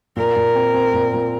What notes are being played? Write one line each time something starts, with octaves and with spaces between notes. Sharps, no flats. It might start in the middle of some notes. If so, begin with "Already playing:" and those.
A#2 A#4
A#2
C4
C4
A#2
A#2